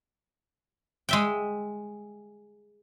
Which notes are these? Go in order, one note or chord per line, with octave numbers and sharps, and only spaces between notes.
G#3 E5 G5